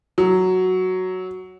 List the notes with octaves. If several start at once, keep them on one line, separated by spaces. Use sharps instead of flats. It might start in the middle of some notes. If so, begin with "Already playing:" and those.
F#3